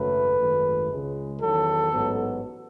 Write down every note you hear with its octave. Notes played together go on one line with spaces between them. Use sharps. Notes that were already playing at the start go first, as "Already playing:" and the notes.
Already playing: G#1 F#2 C#3 F#3 A3 B4
G#1 F#2 D#3 A3
C#2 C#3 G#3
E2 D#3 F#3 A4
A1 G#2 F#3 B3